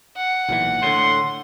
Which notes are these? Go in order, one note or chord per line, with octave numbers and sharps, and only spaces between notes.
F#5
B1 A#2 E3
A2 D3 C6